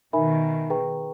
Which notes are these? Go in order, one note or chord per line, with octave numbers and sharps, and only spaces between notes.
B2 D#3 D#4 A#4 E5 G#5 B5
G#4 B4 G5 A#5 C#6